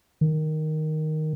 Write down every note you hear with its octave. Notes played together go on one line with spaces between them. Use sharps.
D#3